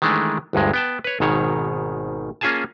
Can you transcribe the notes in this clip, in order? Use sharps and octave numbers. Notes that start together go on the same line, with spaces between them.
D#3 E3 G#3 A3 D4
G1 D2 G2 G#3
B3 G5 A5
B4 C#5
G#1 G#2 B2 D#3 C#5
A#3 C#4 F4 G#4 G#5 A5